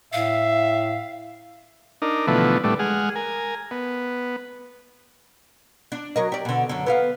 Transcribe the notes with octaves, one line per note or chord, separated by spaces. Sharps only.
A2 E5 F5
D4 D#4 A#4
B2 D3 E3 F3 A3 B3
A2 G3 A3 B3 D4
G#3 G#4 F#5 F6
A#4 G#5
B3
D4
F#3 A#4 D#5
G4 D5
B2 D3
F#2 D3
B3 G4 F5